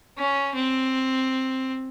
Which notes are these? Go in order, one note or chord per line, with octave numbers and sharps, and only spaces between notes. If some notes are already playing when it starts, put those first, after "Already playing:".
C#4
C4